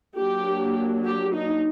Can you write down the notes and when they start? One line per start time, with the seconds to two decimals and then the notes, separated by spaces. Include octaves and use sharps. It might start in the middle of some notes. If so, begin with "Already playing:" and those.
0.17 F#3 A#3 D4 G4
1.04 G4
1.33 D#4